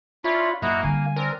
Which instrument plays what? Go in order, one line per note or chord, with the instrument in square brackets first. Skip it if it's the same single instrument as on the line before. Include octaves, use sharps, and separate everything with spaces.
[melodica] D4 E4 C#5 [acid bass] F4 [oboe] B5
[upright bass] F#2 [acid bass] A#3 [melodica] E4 D#5 A#5 [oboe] F#4
[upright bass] D3 G3 [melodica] F5 [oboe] G#5
[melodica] C4 D4 [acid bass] A#4